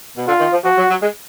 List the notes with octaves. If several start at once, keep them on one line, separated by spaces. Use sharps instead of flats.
B2
D3 F4
D#3
F3
F3 F#4
F#3
F#3
G#3